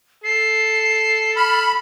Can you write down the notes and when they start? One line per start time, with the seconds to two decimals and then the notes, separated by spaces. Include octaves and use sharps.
0.24 A4 C7
1.36 B5 F6